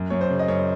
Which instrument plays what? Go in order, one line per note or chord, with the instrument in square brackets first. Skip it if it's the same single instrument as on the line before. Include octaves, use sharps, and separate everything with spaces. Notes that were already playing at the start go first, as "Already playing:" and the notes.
Already playing: [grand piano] F#2
F#2 C#5
C5
C#3
D#5
F#2 C#5